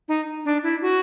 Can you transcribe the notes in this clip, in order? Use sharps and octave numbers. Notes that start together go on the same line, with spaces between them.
D#4
D4
E4
F#4